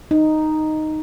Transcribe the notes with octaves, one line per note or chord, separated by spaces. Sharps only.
D#4